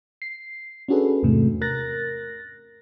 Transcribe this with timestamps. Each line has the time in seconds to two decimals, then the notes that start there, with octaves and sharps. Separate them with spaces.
0.22 C7
0.88 C#4 D4 F#4 G#4 A4 B4
1.23 E2 G#2 C3 A3
1.61 A#4 F#6 A6 A#6